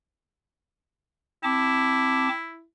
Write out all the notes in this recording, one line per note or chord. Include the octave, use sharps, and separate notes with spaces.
C4 E4 A5 D6